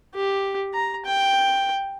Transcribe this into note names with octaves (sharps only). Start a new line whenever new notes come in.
G4
A#5
G5